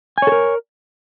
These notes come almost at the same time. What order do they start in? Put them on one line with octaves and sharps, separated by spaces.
G#5 C#5 A4 A#4